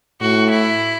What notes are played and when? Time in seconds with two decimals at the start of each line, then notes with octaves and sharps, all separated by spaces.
0.21 A2 F#4
0.50 E4